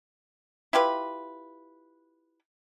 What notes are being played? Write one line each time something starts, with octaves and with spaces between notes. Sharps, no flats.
E4 F4 G4 B4